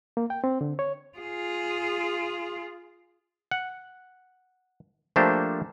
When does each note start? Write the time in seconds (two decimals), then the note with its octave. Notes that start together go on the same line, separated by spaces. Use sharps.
0.17 A#3
0.30 G5
0.44 C4
0.61 D3
0.79 C#5
1.18 F4 G#4
3.51 F#5
5.16 F3 A3 A#3 D4 G4 C5